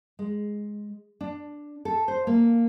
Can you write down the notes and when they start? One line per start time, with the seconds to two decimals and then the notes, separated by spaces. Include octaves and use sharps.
0.19 G#3
1.21 D4
1.85 A4
2.08 C5
2.27 A#3